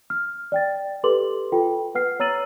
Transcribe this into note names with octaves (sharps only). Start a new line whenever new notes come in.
F6
D5 G5 A6
G4 A4 B4 C6 D6 F#7
F4 A4 G5
B4 F#5 F6 C7
C#5 A#5 E6 A6 D#7 F#7